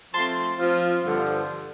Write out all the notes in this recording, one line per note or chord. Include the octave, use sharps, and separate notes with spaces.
F3 A3 C4 A5 C6
F3 C4 F4
G2 D3 F3